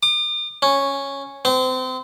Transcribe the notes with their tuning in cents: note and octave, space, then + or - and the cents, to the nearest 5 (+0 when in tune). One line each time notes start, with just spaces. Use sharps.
D6 +45
C#4 -5
C4 -30